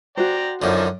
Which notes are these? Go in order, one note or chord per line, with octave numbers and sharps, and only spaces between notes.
F#4 C5 D5 G5 A#5
F#2 D3 E3 F3 D#4